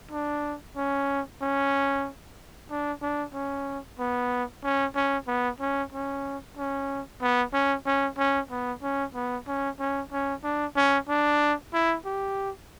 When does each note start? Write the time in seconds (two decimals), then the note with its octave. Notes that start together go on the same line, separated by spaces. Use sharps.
0.11 D4
0.76 C#4
1.41 C#4
2.70 D4
3.02 D4
3.34 C#4
3.99 B3
4.64 C#4
4.95 C#4
5.27 B3
5.60 C#4
5.92 C#4
6.57 C#4
7.21 B3
7.53 C#4
7.86 C#4
8.18 C#4
8.50 B3
8.82 C#4
9.14 B3
9.47 C#4
9.79 C#4
10.12 C#4
10.44 D4
10.76 C#4
11.09 D4
11.73 E4
12.05 G4